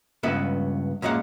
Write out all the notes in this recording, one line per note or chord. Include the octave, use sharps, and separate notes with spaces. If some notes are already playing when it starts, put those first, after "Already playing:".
C#2 G2 B3 C#4 E5
F#2 A#2 G#3 F5 F#5